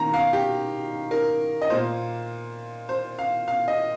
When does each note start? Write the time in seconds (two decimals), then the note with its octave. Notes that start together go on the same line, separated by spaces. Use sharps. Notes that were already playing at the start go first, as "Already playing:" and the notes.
Already playing: D#3 A#3 A#5
0.14 F5
0.33 G4
1.11 A#4
1.62 D#5
1.70 A#2 A#3 C5
2.89 C5
3.19 F5
3.48 F5
3.68 D#5